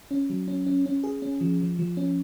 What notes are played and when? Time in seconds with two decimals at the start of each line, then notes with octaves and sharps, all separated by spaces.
0.11 C#4
0.30 F#3
0.48 C#4
0.66 C#4
0.86 C#4
1.04 G#4
1.22 C#4
1.41 F3
1.60 F3
1.79 F3
1.97 C#4